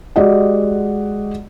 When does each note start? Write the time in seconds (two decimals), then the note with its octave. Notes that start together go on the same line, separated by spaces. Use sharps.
0.16 G#3 F#4 G4 D5 D#5 F#5